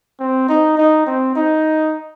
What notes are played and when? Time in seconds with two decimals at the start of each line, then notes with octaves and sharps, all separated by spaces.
0.20 C4
0.49 D#4
0.77 D#4
1.07 C4
1.35 D#4